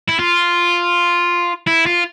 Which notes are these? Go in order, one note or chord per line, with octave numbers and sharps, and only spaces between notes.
E4
F4
E4
F4